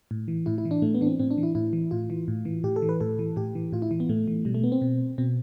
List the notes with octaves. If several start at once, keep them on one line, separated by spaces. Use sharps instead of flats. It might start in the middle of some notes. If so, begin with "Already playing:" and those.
A2
E3
A2 E4
E4
E3
D4
A2 A3
B3
E3 D4
C4
A2 C4
D4
E3
E4
A2 E4
E3
A2 F4
E3
A2
E3
A2 G4
A4
E3
B4
A2 A4
E3
A2 G4
E3
A2 F4
E4
E3
B3
A2 A3
E3
B2 G3
A3
B3
C4
B2
B2 C4